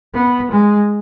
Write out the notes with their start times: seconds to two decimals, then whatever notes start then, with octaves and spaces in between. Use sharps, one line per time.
0.14 B3
0.51 G#3